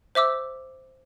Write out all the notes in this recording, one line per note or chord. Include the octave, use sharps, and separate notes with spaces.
C5 E5 D6 E6